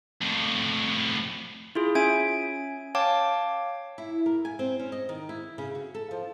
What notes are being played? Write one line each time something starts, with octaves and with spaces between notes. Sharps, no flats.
F2 A2
E4 F4 G#4
C#4 E5 G#5 G#6 D7
C#5 F5 G5 A5 D6
E4
A#4
G#5
C4
C#4
D#5
D#3
E4
C#3
F#4
A4
F3